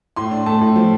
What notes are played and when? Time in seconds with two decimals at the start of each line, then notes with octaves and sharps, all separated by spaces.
0.16 A2 C6
0.31 D4
0.46 A3 A5
0.61 A2
0.76 F3